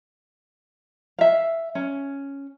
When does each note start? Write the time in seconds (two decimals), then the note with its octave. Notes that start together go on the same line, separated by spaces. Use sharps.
1.19 E5 F5
1.75 C#4